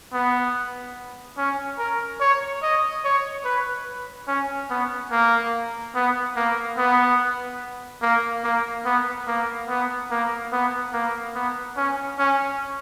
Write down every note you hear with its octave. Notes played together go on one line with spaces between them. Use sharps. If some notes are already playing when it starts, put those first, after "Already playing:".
B3
C#4
A#4
C#5
D#5
C#5
B4
C#4
B3
A#3
B3
A#3
B3
A#3
A#3
B3
A#3
B3
A#3
B3
A#3
B3
C#4
C#4